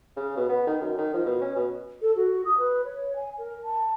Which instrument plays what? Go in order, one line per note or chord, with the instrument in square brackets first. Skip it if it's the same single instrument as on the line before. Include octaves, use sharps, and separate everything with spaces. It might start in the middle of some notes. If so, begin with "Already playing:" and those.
[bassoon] C#3
B2
B3
D#3
F#2
D#3
F3
B2
C#4
B2
[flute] A4
F#4
D#6
B4
C#5
G#5
A#4
A5